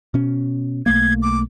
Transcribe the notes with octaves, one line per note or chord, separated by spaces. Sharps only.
B2 C#4
B1 A3 A#3 G#6
D6